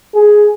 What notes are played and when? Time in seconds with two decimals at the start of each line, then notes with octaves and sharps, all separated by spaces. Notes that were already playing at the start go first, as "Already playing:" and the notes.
0.14 G#4